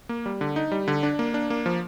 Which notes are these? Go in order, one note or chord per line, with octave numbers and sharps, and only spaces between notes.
A#3
G3
D3
D#4
G3
D3
D4
A#3
D4
A#3
F3